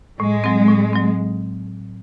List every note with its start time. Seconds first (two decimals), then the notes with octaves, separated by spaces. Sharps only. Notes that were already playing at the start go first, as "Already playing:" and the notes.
0.20 A2 G#3
0.44 F#3 C4
0.68 A2
0.93 F#3 C4